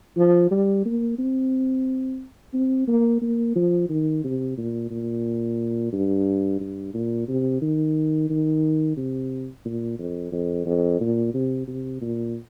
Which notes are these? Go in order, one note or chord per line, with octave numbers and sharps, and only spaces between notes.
F3
G3
A#3
C4
C4
A#3
A#3
F3
D#3
C3
A#2
A#2
G2
G2
A#2
C3
D#3
D#3
C3
A#2
F2
F2
F2
A#2
C3
C3
A#2